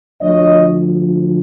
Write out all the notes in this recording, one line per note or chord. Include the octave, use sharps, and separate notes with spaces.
D2 D3 F3 C#5 D#5